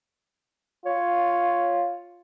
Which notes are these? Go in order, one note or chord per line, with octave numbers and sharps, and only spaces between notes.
F4 C#5